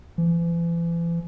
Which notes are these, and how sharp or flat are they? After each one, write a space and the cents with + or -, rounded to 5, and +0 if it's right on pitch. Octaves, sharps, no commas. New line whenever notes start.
E3 +40